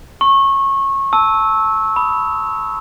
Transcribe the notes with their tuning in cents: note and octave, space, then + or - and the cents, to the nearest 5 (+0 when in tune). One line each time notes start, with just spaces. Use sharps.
A#5 +20 C#6 -25
A5 +0 E6 -15
B5 +0 D#6 +0